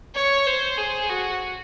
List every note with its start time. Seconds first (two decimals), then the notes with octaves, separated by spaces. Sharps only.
0.15 C#5
0.47 C5
0.78 G#4
1.09 F#4